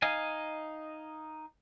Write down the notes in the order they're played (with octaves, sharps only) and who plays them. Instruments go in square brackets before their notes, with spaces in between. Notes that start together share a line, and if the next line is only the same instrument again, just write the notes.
[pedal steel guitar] D#4 D#5 F5 G#5